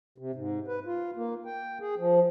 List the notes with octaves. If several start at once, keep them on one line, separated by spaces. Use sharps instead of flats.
C3
G#2
B4
F4
A#3
G5
G#4
F3